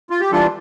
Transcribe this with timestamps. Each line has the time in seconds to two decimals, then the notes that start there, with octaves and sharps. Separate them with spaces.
0.10 F4
0.20 G4
0.32 E3 G3 D4 F4 A4